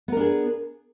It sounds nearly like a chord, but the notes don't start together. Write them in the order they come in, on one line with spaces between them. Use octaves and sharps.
B3 A#4 D4 G#4